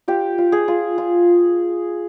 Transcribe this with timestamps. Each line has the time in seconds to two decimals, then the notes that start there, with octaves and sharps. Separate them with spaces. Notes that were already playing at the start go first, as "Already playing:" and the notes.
0.08 F4 G4
0.38 F4
0.52 G#4
0.68 F4
0.98 F4